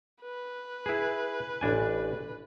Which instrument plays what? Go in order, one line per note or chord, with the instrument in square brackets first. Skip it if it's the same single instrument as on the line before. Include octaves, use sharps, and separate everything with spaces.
[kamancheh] B4
[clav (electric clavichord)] E4 G#4
A1 D4 G#5